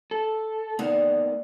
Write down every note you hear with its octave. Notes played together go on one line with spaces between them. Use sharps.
A4
D3 A#3 B3 D#4